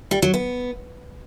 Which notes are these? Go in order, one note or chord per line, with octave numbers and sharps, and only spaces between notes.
G3
F#3
B3